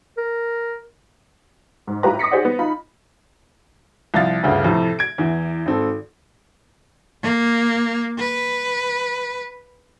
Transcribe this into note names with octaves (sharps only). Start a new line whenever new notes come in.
A#4
G#2
A2 F4 G4 B4 A#5
D6 D#6 A#6 B6 C#7
G4 G#4 C5 D5 F#5
B3
D#4 F4 B5
C2 F3 F5 A6
G1 D2 C#3
F2 A2 C3
G#6 D7
E2 E3
G#1 C4 A4
A#3
B4